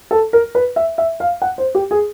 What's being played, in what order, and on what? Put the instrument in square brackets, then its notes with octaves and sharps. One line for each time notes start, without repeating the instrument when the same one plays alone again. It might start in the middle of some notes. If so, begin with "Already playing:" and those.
[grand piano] A4
A#4
B4
E5
E5
F5
F#5
C5
G4
G#4